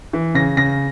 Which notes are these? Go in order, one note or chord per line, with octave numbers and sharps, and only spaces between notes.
E3
C#3 A#6
C#3 A#6